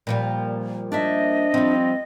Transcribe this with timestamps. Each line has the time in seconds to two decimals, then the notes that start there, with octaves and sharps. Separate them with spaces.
0.07 A#2 F3 G3
0.92 D4 C5 D#5 E5
1.54 F3 G3 C4